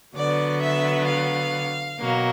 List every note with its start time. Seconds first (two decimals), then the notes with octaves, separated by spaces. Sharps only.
0.16 D3 F#3 B3 D5
0.62 E5
1.08 F5
2.00 B2 F#3 A#3